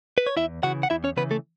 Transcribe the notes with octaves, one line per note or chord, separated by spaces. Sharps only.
B4
C#5
E2 E4 E5
C#3 E3 F#4 F#5
F#5
E2 E4 E5
C#4 C#5
C#3 E3 B3 B4
A3 A4